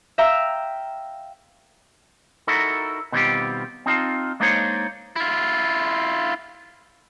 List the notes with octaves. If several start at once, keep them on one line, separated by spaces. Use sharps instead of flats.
E5 F5 G5 A#5 E6
D#4 E4 F#4 A4 A#4
B2 D#3 G3 C4 F4 G4
C4 D#4 F4 A5
G#3 A#3 D4 D#4 C5 C#5
E4 F4